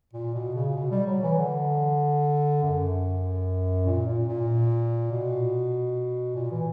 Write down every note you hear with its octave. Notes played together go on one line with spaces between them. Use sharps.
A#2
B2
C#3
B2
G3
F#3
E3
D3
F#2
A#2
A#2
A#2
B2
A#2
E3